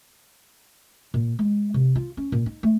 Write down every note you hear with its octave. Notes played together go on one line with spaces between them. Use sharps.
A#2
G#3
C3
F4
C#4
A#2
D#4
A3